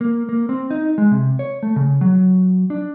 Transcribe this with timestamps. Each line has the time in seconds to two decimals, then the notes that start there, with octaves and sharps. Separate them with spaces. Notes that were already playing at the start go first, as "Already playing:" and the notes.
0.01 A#3
0.29 A#3
0.49 C4
0.71 D#4
0.98 G#3
1.11 C3
1.39 C#5
1.63 A3
1.76 C#3
2.01 F#3
2.70 D4